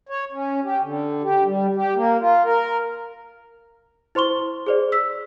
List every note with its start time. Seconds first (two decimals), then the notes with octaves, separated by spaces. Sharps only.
0.09 C#5
0.32 C#4
0.64 G4
0.81 D3
1.23 G4
1.45 G3
1.76 G4
1.95 A#3
2.20 F4
2.44 A#4
4.15 E4 C5 C6 C#6 G7
4.66 G#4 C5 D5
4.92 E6 B6